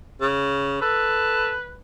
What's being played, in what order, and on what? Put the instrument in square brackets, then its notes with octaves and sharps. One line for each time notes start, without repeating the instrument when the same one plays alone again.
[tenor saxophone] C#3
[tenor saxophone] A4 [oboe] B4